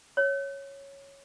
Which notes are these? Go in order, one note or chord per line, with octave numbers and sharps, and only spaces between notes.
C#5